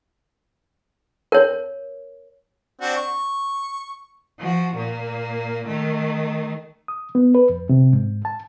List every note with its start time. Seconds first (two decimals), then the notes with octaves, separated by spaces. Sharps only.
1.32 A#4 C#5
2.81 C4 D4 F#4
2.96 C#6
4.39 F3 F#4
4.75 A#2 A#3
5.66 D#3 A3
6.88 D#6
7.15 B3
7.35 B4
7.50 F2
7.69 C3
7.93 G#2
8.25 A5